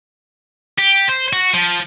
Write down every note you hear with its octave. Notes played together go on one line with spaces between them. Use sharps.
G4
C5
F#4
F3